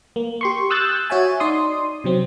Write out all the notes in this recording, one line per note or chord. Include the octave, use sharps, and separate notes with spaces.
A#3
G4 C6 C#6
D#6 E6 F#6 G6 A6
F#4 C#5 E5 G#5
D#4 D5 C6 D#6
C3 F#3 C4